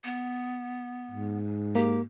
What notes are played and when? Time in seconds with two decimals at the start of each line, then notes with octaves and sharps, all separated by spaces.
0.04 B3
1.11 G#2
1.75 A#3 G4